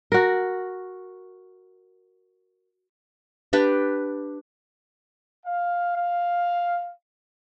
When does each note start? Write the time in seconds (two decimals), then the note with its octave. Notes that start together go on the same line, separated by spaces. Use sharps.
0.12 F#4 A#4
3.53 D4 G4 B4 G5
5.46 F5
5.95 F5